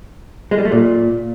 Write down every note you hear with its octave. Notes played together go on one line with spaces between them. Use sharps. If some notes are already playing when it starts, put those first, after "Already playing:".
G#3
G3
A3
A#2